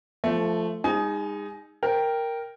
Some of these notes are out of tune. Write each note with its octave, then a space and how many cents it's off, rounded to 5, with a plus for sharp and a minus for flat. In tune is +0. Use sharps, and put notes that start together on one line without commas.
F3 -10 A3 +0
G#3 -35 D#4 +0 G#5 +30
A#4 +0 G5 +0